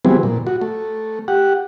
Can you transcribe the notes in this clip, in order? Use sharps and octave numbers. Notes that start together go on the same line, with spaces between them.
E3 F#3 G3 B3 C4 G#4
A#2
F#4
A3
G4 F#5